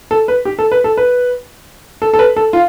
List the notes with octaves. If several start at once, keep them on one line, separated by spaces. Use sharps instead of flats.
A4
B4
G4
A4
B4
A4
B4
A4
A4
B4
A4
F4